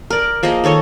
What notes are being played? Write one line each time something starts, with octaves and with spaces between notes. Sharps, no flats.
A#4 D5
F3 A#3 G#4 D#5
D#3 A4 C#5 D#5